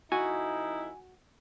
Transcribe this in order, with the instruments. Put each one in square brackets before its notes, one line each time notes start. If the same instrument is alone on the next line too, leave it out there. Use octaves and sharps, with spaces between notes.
[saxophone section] F2 E4 [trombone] D#4 [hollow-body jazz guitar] F#4 [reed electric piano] G#5